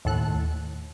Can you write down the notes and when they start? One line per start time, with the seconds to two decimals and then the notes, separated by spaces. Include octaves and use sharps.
0.05 D#2 A2 A4 F#6